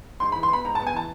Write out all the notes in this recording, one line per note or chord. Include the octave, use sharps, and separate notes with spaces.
G#2 C6
E3 B5
C6
B3 B5
G#2 A#5
A5
B3
G#5
E3 A5